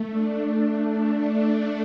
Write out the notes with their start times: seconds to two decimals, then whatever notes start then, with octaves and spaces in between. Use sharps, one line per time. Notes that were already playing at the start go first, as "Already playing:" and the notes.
Already playing: A3
0.10 D4